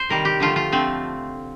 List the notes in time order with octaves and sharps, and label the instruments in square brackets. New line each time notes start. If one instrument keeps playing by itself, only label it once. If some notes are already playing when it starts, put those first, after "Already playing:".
Already playing: [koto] C5
C3 D#3 G3 A#4
G4
D3 F3 A3 F4
F4
D3 F3 A3 C4